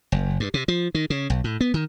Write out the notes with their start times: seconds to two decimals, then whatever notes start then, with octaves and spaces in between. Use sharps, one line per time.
0.12 F#1
0.40 G2
0.54 C3
0.68 F3
0.95 D#3
1.10 C#3
1.30 B1
1.44 A2
1.61 B3
1.74 D#3